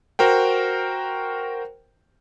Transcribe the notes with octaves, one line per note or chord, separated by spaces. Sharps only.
F#4 A#4 C5 G5